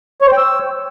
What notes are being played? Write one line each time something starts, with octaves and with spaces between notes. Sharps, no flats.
C#5
C5
G5
E6